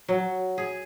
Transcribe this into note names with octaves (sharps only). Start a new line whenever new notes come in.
F#3
G#4